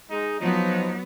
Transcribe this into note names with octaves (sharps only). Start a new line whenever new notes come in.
G#3 D#4
F3 F#3 B3 D#4